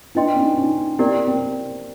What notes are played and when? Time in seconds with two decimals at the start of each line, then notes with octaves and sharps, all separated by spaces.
0.15 D4 E4 B4 D#5 G5 C6
0.36 C#4 D#4
0.57 C#4 D#4
0.99 C4 E4 G4 A#4 D5
1.27 C4